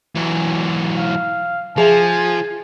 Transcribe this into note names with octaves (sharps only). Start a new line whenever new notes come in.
E3 F#3
F5
F3 G#4 E5 G#5